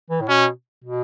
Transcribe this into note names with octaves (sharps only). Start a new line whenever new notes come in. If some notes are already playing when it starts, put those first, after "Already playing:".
E3
A2
B2 C#4
B2